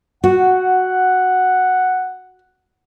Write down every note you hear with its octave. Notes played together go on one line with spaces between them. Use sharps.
F#4 F#5